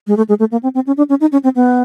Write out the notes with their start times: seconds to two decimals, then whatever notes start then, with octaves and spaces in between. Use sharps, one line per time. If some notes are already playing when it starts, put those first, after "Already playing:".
0.07 G#3
0.17 A3
0.29 G#3
0.39 A3
0.52 A#3
0.63 C4
0.75 C4
0.87 C#4
0.97 D4
1.09 C#4
1.21 D#4
1.32 C#4
1.44 C4
1.56 B3